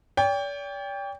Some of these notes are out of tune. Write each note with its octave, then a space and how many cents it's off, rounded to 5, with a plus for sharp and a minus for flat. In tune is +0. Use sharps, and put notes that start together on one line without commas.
D5 -45 G5 +20